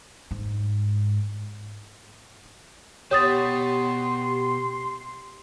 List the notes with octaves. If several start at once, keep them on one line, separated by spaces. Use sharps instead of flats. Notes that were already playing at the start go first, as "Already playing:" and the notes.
G#2
B2 G4 C#5 C6 D#6 A6